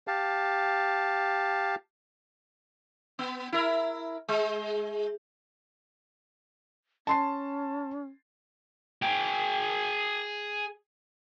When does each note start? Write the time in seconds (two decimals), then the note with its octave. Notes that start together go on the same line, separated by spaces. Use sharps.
0.07 G4 F5 A5
3.19 B3
3.52 E4 A#4
4.28 G#3
7.07 C#4 A5 C6 C7
9.02 G#4 G5